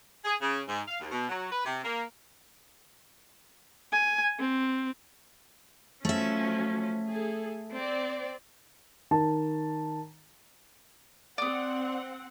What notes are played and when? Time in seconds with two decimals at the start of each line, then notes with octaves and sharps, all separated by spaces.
0.24 G#4
0.42 C#3
0.68 G#2
0.88 F5
1.00 D#2
1.11 B2
1.29 F#3
1.52 B4
1.66 C3
1.84 A#3
3.92 G#5
4.40 C4
6.05 F3 F#3 A3 C#4 E5
7.07 G#4 A4
7.73 C4 D5
9.11 D#3 A5
11.38 C4 D5 F#5 D#6